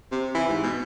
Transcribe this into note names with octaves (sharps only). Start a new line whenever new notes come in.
C3
E3
G#2
B2